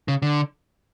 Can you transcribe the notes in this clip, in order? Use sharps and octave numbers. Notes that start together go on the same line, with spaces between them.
C#3
D3